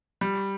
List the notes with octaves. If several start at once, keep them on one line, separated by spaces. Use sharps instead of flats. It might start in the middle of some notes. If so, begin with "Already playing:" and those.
G3